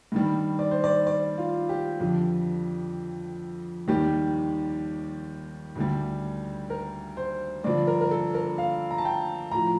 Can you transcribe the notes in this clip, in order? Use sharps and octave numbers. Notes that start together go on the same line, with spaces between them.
G2 D#3 G3
D5
C5
D5
D5
F4
G4
F2 D3 F3
D#2 D#3 G3 G4
D2 D3 G3
A#4
C5
G2 D3 F3 D5
A#4
A#4
A4
A#4
F5
A#5
A5
G5
A2 F3 A#5